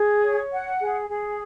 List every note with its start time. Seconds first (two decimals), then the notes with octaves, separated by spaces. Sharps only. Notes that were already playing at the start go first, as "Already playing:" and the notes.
Already playing: G#4
0.23 C#5
0.51 F#5
0.80 G#4
1.09 G#4